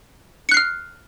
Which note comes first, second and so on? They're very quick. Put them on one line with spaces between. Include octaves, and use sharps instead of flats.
C#7 F#6 C7 F6